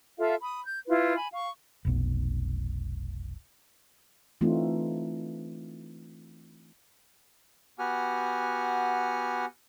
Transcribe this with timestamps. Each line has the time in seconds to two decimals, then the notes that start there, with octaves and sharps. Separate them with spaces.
0.19 F4 A4 E5 F5
0.42 B5 D#6
0.65 G6
0.87 E4 F4 B4
1.16 G#5 B5
1.34 F5 C#6
1.85 F1 B1
4.41 E3 A3 C4 D4 D#4 F4
7.79 B3 F#4 G4 F#5 G#5 F6